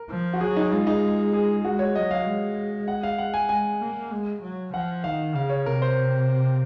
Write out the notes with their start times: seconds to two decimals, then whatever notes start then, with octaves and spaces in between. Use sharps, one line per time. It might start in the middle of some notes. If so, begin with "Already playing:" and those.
Already playing: A#4
0.09 F3
0.33 F#4
0.40 F#3 G#4
0.57 D#4
0.71 G#3 F4
0.87 D#4
1.33 G#4
1.64 G#3 F#4
1.79 C#5
1.95 F#3 D#5
2.11 F5
2.26 G#3
2.88 F#5
3.03 F5
3.18 F#5
3.34 G#5
3.49 G#3 G#5
3.81 A#3
4.11 G#3
4.42 F#3
4.74 F3 F#5
5.04 D#3 F5
5.35 C#3 F5
5.50 C#5
5.65 C3 A#4
5.82 C5